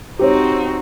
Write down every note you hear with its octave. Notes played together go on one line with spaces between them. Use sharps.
C4 D#4 F#4 G4 C5 C#5